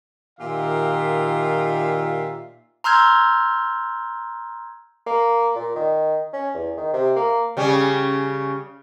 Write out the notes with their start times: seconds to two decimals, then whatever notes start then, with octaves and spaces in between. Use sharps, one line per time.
0.40 A#2 D#3 F4 G4 E5 F5
2.84 A#5 C6 E6 F6 G6 G#6
5.07 A#3
5.56 A#2
5.76 D#3
6.33 C#4
6.54 E2
6.77 D#3
6.93 C3
7.16 A#3
7.57 C#3 G3 C#4